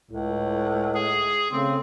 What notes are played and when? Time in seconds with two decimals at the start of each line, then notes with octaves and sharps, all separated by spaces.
0.11 C#2 A2
0.94 G#4
1.52 C#3 A3 C4